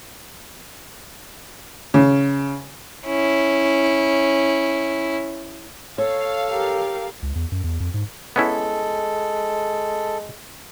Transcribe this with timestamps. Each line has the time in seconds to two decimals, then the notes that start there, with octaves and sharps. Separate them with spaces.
1.94 C#3
3.06 C#4 E4
5.98 A4 C#5 F5
6.50 G4 A#4
7.22 C#2
7.35 E2
7.52 F#2
7.64 E2
7.80 F2
7.94 G#2
8.36 G#3 B3 C#4 E4 A4